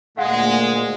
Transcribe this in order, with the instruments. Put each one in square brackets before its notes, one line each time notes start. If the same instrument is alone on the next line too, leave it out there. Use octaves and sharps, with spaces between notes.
[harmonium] D2 A#2 [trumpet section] G#3 [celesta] F5 F#5